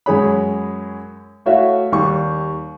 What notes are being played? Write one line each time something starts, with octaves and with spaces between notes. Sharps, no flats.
F#2 G#3 G#4 C#5 B5
A3 E4 F#4 C#5 E5 F5
D#2 G3 C#6